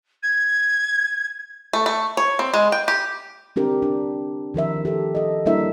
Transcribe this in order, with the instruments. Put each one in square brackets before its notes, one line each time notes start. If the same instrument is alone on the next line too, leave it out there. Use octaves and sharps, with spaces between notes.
[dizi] G#6
[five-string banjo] A3
A3
C#5
C4
G#3
G5
G4
[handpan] C4 D4 G4 A#4
D4
D#3 F3 A#4 E5
G4 A4
A4 D#5
G3 A#3 D4 E4 A#4 E5